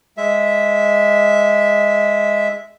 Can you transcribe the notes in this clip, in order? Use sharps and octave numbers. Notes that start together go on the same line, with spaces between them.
G#3 E5